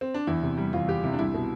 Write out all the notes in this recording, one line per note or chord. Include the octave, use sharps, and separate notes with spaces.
C4
D4
E2 E4
C3
G3
E2 F4
E2 G4
C3 E4
D4
C2 E4
B2